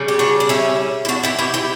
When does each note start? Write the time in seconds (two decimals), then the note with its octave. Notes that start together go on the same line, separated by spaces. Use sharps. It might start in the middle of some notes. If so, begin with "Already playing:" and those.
Already playing: C#3 G3
0.08 G4
0.19 D4 F#4
0.40 D4
0.49 C#4 E4
1.05 E4
1.08 D4 F#4
1.23 E4 G4
1.39 E4 G4
1.54 E4 G4